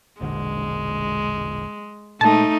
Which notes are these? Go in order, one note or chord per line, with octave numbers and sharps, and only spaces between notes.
E1 A#1 D3 G#3
A#2 G#3 A3 D#4 A5